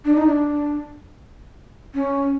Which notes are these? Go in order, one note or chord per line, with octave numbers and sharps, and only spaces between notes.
D4
D#4
D4
C#4